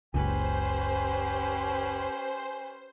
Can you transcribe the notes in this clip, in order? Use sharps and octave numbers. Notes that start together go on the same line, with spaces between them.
F#1 C#2 C#4 G4 B4 C5 G#5